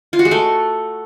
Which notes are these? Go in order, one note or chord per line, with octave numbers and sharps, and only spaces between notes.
F4
F#4
G#3
A3